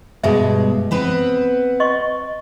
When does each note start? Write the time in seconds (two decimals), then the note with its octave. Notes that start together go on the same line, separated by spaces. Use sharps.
0.24 G2 B2 G#3 E5
0.91 B3 C4 B4
1.80 D#5 C6 C#6